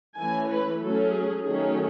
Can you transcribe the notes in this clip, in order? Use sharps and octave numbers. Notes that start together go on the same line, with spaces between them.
E3 A3 C#4 G#5
B4
F#3 A3 C#4 A4
G#4
D#3 F#3 A3 C#4 G#4